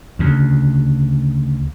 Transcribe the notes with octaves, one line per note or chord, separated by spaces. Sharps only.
D2 C#3